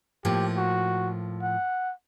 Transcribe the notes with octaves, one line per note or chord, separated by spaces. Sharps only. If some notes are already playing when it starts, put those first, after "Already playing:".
A2 F3 A#3 G4
F#4
F#5